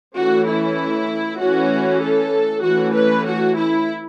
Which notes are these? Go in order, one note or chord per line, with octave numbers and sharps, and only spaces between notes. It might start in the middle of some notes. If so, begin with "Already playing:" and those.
E3 A3 C#4 F#4
E4
E3 A3 C#4 F#4
A4
E3 A3 C#4 F#4
B4
F#4
E4